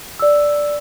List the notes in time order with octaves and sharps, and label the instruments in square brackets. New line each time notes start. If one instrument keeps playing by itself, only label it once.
[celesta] D5 E6